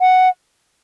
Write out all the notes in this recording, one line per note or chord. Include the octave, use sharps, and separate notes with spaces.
F#5